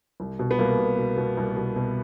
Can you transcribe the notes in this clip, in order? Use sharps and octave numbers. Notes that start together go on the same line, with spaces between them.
C2
B2
B3
C2 A#3
B2
B2
B2
C2
B2
B2